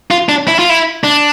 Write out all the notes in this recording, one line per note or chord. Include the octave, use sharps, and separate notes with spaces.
F4
D4
E4
F4
E4
D4